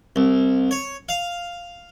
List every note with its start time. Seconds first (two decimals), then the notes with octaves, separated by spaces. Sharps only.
0.16 C2
0.71 C#5
1.09 F5